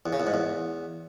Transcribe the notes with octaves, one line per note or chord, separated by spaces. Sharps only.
E2
C#3
E2
G#2
E2